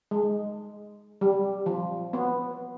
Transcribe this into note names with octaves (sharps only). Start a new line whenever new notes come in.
G#3
G3
F3
B3